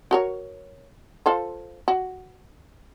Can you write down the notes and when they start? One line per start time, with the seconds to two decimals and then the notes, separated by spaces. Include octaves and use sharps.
0.11 F#4 A#4 C#5
1.26 F4 A4 C5
1.88 F#4